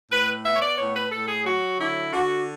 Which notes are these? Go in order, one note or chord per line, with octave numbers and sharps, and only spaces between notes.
A2 B4
B3 E5
C#5
D5
A2 C#5
B4
A2 A4
G#4
F#3 F#4
D3 E4
D3 F#4